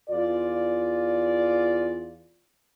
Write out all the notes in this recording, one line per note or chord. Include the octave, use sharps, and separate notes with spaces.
E2 F4 D5